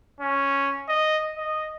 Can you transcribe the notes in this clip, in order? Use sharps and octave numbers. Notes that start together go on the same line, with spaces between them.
C#4
D#5
D#5